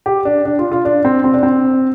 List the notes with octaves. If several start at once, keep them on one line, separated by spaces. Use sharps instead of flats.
G4
D4
D4
F4
F4
D4
C4
C4
D4
C4